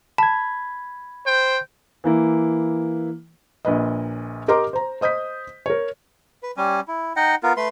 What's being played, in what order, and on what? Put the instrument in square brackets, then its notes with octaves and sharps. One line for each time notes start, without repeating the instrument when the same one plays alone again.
[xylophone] A5 [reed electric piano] B5 G#6
[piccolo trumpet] C5 [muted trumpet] G5
[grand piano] E3 A#3 E4
[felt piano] A#1 A#2 B4 D#5
G4 A#4 D#5 A#5 C6 D6
C5 A#5
C5 D#5 D#6 G6 B6
A#4 C#5
[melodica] B4
G3 C#4 G#5
E4
D#4 D#5 F#5 G5
B3 F4 A#4
A3 B4 C6